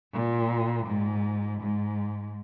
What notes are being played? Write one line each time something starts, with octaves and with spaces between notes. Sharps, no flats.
A#2
G#2
G#2